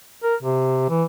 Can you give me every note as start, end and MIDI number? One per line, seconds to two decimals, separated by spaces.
0.23 0.35 70
0.42 0.87 48
0.90 1.04 52